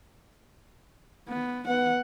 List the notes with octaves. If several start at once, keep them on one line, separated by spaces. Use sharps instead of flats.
B3
B3 F#5